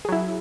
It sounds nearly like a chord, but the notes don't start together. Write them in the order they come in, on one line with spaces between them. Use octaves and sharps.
G#4 F#3 E4